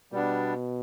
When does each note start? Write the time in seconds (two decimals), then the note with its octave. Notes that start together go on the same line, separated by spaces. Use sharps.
0.12 B2 G3 B3 D4